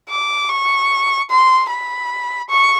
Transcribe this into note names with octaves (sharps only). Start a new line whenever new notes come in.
D6
C#6
C6
B5
C#6